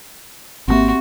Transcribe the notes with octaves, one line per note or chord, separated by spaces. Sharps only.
G#1 B2 A#3 C4 F#4 G4 E5